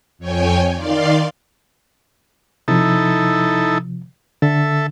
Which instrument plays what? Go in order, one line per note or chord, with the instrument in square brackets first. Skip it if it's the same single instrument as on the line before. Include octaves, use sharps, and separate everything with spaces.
[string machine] F2 C#5 G5 G#5
D#3 D5 F5 C6
[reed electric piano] C3 F3 [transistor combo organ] D#4 E4 A4
[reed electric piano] D3 [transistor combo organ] A4 E5